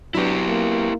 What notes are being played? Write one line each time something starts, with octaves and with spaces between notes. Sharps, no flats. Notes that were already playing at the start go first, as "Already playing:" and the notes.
F#3 B3 D4 E4 G4
A#3